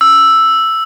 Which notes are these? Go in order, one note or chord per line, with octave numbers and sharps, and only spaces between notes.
E6